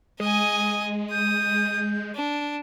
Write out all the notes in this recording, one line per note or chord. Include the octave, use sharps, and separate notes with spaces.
G#3 D#5 G#5 D#6
D#6 G6
D4